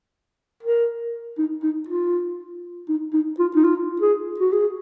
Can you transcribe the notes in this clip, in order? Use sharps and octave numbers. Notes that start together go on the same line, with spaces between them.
A#4
D#4
D#4
F4
D#4
D#4
F4
D#4
F4
G#4
F#4
G#4